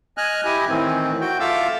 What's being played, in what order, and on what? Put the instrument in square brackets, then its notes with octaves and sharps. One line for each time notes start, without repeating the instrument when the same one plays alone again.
[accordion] D#5 G#5 F6 F#6
E4 G4 D#5 G#5
A2 D#3 E3 C4
F#4 G5
F4 A4 E5 F5 D6 E6